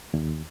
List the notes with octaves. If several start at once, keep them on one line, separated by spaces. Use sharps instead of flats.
D#2